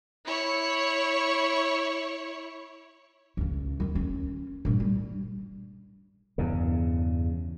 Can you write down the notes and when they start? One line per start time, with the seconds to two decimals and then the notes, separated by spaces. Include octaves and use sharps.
0.25 E4 C#5 C#6
3.37 C#2 C#3
3.80 D#2 D#3
3.95 C#4
4.65 G2 A#2
4.80 G3
6.38 E2 G2 C#3